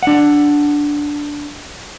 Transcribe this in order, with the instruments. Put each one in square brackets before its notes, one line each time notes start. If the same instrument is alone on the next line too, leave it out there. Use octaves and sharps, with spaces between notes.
[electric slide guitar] D4 F#5